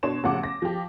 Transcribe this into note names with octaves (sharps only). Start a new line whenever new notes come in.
B2 D4 C#5 C6 E7
A1 C#3 F3 F#5 D6
A#6
F3 G4